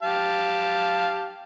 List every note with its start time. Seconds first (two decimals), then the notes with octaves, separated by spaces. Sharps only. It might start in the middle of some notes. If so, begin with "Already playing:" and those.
0.03 G4 F5 A5